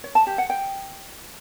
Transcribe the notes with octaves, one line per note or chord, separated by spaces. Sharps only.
C#5
A5
G4
F#5
G5